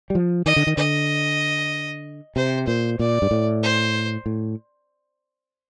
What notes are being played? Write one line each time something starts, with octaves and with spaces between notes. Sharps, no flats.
G3
F3
D#3 D#5
D3
D#3
D3 D#5
C3 C5
A#2 C5
A#2 D5
G2
A2
C5
A2